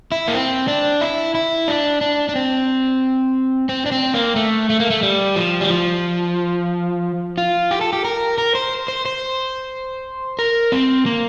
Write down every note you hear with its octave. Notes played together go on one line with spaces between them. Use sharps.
E4
A#3
C4
D4
E4
E4
D4
D4
D4
C4
C4
D4
C4
A#3
A3
A3
A#3
A3
G3
F3
G3
F3
F4
G4
A4
G4
A#4
A#4
C5
C5
C5
A#4
C4
A#3